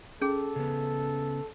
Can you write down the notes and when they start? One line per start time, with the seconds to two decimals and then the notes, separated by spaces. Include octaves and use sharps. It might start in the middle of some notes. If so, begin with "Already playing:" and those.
0.21 C#4 G#4 A4
0.56 C#3 B3